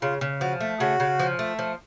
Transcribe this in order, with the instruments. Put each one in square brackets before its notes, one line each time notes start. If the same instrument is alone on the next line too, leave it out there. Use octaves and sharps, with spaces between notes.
[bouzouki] C#3 [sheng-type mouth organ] F4
[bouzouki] C#3
[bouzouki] F3 [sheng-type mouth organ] F#4
[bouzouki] A3
[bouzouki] C#3 [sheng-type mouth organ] F#4
[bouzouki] C#3
F3
A3
F3